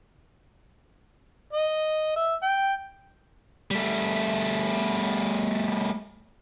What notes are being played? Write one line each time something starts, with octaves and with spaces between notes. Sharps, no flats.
D#5
E5
G5
G3 A3